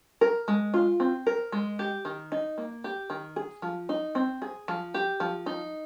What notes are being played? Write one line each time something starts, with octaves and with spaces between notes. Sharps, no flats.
A#4
G#3
F4
C4
A#4
G#3
G4
D#3
D#4
A#3
G4
D#3
G#4
F3
D#4
C4
G#4
F3
G4
F3
D#4